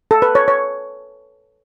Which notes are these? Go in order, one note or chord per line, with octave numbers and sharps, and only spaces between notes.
A4
B4
C#5
C#5